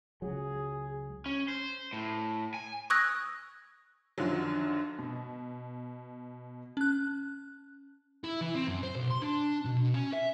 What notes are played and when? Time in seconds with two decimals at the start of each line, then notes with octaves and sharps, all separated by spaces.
0.22 C#2 F#3 G#4
1.26 C#4
1.48 C5
1.93 A2
2.54 G#5
2.90 C#6 D#6 E6 F#6 G#6 A#6
4.18 F#2 D3 D#3 F3 F#3
4.98 B2
6.77 C#4 F#6
8.24 E4
8.41 E3
8.55 C4
8.67 F#2
8.83 C5
8.96 B1
9.10 C6
9.22 D4
9.65 B2
9.94 C#4
10.13 E5